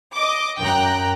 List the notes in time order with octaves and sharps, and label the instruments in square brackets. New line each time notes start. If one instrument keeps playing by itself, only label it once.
[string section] D#5 D6
F#2 G5 A#5 F#6